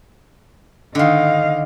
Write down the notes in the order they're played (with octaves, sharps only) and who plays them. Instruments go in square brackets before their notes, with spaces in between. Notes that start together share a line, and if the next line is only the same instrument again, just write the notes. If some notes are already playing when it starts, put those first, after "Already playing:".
[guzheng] D3 D#3 [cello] D#5 F5